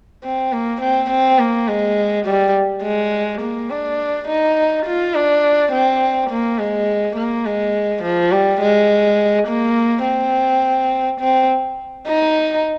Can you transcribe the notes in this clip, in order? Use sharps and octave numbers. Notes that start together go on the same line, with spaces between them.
C4
A#3
C4
C4
A#3
G#3
G3
G#3
A#3
D4
D#4
F4
D4
C4
A#3
G#3
A#3
G#3
F3
G3
G#3
A#3
C4
C4
D#4